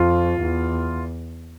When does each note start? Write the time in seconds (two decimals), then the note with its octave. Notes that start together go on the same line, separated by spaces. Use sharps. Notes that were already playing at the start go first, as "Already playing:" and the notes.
Already playing: F2 F4
0.41 E2